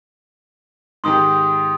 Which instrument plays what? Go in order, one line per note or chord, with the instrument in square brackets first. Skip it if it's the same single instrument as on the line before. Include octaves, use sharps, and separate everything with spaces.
[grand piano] G#2 D#3 G4 [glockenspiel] C6 D#6